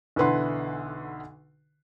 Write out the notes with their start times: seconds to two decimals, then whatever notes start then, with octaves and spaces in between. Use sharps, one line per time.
0.16 B1 D3 E3 B4 F#5 C6